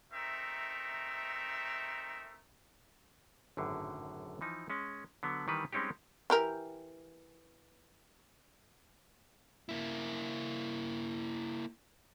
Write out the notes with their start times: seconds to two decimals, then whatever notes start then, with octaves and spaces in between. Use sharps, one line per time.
0.12 A3 C4 D#4 A#4 E5
3.57 G#1 F#2 A2 D3
4.41 E3 F3 D#4
4.70 G#3 C#4
5.23 D3 F#3 B3
5.48 D#3 E3 G3 B4
5.73 G3 G#3 C4 C#4 D#4 G4
6.30 E3 G4 A#4
9.69 A#3 E4